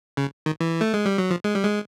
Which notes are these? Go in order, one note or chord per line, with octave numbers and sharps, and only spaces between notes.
C#3
D#3
E3
A3
G#3
G3
F#3
F3
G#3
G3
G#3